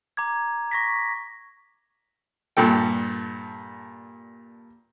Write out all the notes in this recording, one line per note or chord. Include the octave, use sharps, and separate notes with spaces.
A#5 D6 G#6
C#6 A#6 B6
G2 A#2 A4 G5